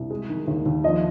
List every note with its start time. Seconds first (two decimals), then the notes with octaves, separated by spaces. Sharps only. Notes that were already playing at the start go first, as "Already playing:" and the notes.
Already playing: C2
0.10 G#3
0.29 D#3
0.48 D#2
0.66 D#2
0.84 F3 D#5